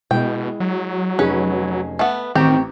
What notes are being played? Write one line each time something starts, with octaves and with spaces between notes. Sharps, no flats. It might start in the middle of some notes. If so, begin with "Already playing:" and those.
B2 G#3 E4 D#5 G5
F#3
F1 C#4 D#4 G#4 B4
A3 B3 E5 F#5
A1 D#3 C4 G4 A#5 C#6